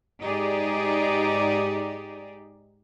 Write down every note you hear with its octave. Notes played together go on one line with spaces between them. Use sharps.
G#2 D#4 G4 G#4 D5